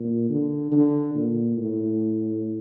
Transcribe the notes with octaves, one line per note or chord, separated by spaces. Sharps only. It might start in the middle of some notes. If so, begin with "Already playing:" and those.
Already playing: A#2
D3
D3
A#2
A2